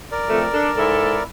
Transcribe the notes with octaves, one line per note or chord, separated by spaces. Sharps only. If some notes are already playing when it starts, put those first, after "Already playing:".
A#4 D5
F2 A3
D4 A4
G#2 E4 A4